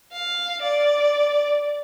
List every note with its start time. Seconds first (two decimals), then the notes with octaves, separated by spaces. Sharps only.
0.12 F5
0.62 D5